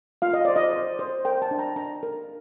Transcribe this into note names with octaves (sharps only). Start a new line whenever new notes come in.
F4 F5
D#5
C5 D5
D#5
C5
C5
A#4 G5
A5
D4
A#5
D4 A#5
A#4